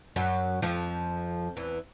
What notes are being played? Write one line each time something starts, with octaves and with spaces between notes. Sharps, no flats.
F#2 F#3
F2 F3
E2 E3